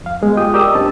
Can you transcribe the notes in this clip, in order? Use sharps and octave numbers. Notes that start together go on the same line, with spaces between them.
F2 F5
G#3 B3
F4 G4 G5 D#6
G4 A#4 D5 D#5 D#6 E6
C4 D4 A5